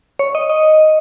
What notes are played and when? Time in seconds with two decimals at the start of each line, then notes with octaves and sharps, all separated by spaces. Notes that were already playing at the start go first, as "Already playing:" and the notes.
0.19 C#5
0.35 D#5
0.50 D#5